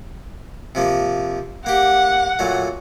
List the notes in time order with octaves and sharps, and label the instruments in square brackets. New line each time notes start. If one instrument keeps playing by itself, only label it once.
[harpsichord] C3 F3 A#3
[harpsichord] A#3 G4 [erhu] F#5
[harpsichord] A#2 F#3 A3